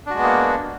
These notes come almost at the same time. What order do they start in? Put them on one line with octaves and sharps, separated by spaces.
D4 F#4 G#3 B3 A#3